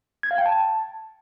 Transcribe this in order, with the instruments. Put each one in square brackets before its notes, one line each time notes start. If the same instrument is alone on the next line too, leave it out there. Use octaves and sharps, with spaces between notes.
[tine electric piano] G#6
F5
G5
A5